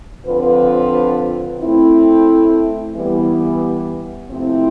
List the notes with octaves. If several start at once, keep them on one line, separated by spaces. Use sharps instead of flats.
D3 F3 C4 F4 B4
A3 C4 E4
E3 G3 B3
C3 F3 A3 C4 E4